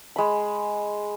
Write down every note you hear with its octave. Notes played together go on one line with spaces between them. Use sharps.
G#3 B5